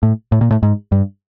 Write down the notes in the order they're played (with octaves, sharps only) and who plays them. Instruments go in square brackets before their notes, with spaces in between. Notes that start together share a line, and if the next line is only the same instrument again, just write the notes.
[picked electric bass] A2
A2
A#2
A2
G#2
G2